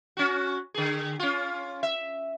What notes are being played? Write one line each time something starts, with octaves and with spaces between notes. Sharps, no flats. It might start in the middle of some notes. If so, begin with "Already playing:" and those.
C#4 F#4
D3 G#4
C#4 F4
E5